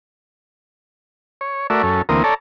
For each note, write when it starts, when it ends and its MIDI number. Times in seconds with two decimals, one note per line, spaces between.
1.41 1.67 73
1.70 1.82 57
1.70 1.82 66
1.70 1.82 70
1.70 1.82 74
1.70 1.82 76
1.83 2.02 42
1.83 2.02 61
1.83 2.02 69
2.09 2.23 38
2.09 2.23 52
2.09 2.23 58
2.09 2.23 60
2.09 2.23 70
2.09 2.23 87
2.24 2.34 69
2.24 2.34 73
2.24 2.34 74
2.24 2.34 81
2.24 2.34 82